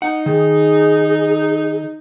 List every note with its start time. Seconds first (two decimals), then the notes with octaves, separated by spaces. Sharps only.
0.02 D#4 F#5
0.26 D#3 G#4